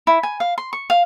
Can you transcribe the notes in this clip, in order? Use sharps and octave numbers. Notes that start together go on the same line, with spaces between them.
E4
G#5
F5
C6
C#6
F5